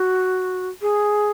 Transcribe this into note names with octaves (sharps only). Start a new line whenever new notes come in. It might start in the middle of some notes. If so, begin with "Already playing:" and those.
Already playing: F#4
G#4